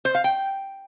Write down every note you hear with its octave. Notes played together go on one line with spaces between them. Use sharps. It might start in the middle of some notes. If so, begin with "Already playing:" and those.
C5
F5
G5